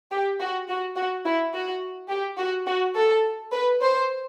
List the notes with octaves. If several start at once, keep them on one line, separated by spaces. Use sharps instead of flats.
G4
F#4
F#4
F#4
E4
F#4
G4
F#4
F#4
A4
B4
C5